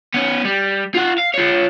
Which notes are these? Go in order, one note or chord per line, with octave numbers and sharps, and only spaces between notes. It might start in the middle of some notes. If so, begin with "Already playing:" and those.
B3 C#4
G3
F4 F#5
F5
F4 C#5